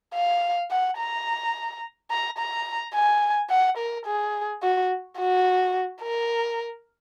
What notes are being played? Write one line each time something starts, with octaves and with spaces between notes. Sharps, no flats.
F5
F#5
A#5
A#5
A#5
G#5
F#5
A#4
G#4
F#4
F#4
A#4